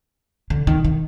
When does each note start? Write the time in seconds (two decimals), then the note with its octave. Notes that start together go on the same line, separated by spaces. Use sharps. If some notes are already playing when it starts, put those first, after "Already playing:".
0.50 D3
0.67 D#3
0.85 D#3